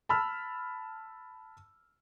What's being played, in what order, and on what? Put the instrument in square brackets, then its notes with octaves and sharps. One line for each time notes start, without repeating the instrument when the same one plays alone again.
[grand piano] A5 B5 E6 F6